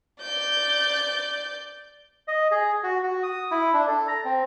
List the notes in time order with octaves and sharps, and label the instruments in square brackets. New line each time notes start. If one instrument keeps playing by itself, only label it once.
[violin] D5 G6
[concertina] D#5
G#4
F#4
F#4
D#6
E4
D4
A4
A#5
C4